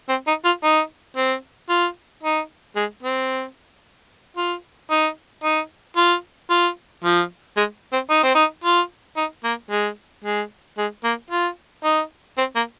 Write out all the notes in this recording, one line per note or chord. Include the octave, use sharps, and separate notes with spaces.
C4
D#4
F4
D#4
C4
F4
D#4
G#3
C4
F4
D#4
D#4
F4
F4
F3
G#3
C4
D#4
C4
D#4
F4
D#4
A#3
G#3
G#3
G#3
A#3
F4
D#4
C4
A#3